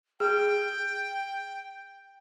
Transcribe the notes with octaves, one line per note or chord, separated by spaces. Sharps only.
G#4 G5